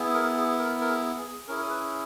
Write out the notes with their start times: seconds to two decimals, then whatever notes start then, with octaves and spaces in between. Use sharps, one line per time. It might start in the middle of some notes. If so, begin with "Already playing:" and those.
Already playing: B3 E4 G#4
0.14 A#4
0.37 G#4
0.59 A#4
0.81 A#4
0.89 G#4
1.18 G#4
1.48 C#4 E4 G#4 A#4
1.70 B4